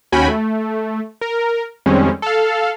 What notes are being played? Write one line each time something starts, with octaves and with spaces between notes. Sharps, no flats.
D#2 C#4 F#4 G5 G#5 B5
A3
A#4
F2 D#3 G3 G#3 C4 C#4
A4 F5